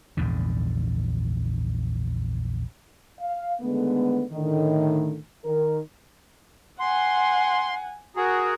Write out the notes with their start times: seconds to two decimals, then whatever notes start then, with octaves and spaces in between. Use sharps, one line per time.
0.17 A#1 E2 G#2 D3
3.21 F5
3.61 D3 D#3 G#3 A3 B3
4.32 A2 D3 D#3
5.45 D#3 A#4
6.80 F#5 G#5 C6
8.16 F#4 G#4 A#4